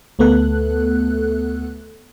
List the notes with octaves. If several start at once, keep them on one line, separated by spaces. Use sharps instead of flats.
D2 A3 B3 A4 F#6